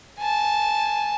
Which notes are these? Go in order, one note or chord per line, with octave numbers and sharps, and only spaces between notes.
G#5 A5